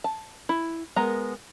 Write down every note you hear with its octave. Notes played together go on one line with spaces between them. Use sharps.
A5
E4
G#3 B3 A#4 A#5